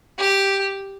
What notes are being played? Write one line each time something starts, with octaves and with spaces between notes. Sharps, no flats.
G4